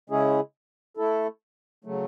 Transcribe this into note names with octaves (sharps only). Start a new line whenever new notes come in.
C#3 G#3 C#4 E4 G#4
A3 E4 A4
C#3 F#3 A3